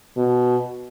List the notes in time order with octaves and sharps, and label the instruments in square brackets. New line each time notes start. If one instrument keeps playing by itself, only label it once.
[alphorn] B2